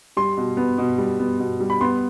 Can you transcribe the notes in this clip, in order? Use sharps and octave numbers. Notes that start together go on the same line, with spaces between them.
G3 C6
B2
B3
B2
G3
B3
B2
G3
B5
B3 C6